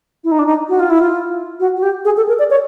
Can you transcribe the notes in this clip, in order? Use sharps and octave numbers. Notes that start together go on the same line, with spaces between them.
E4
D#4
D4
D#4
F#4
F4
E4
F4
F#4
F#4
G4
G#4
A4
A#4
D5
C#5